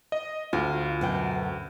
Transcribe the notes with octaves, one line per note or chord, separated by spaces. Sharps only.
D#5
D2 F4
F#2 B2 G5